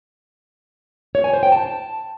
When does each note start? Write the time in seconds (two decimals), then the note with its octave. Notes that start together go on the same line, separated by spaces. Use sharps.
1.15 C#5
1.24 G#5
1.33 C5
1.43 G5
1.52 A5